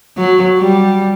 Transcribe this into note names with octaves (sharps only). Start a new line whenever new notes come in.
F#3
G3